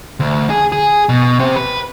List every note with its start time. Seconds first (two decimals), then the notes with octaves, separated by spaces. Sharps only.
0.20 D2
0.50 G#4
0.72 G#4
1.09 B2
1.40 C4 G4
1.56 B4